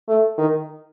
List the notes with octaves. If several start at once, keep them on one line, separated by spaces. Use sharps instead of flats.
A3
D#3